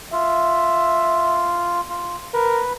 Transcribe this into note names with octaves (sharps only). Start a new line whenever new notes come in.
F4 E5
F4
A#4 B4